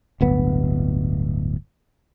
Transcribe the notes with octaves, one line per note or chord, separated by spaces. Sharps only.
D1 G1 B3